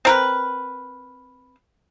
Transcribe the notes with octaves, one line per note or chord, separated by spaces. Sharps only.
C4 A#4 B4